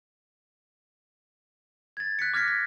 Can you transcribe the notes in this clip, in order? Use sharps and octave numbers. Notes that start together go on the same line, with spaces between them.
G#6 A6
F#6 B6 C#7
D6 F6 G#6 A#6 B6 C#7
B6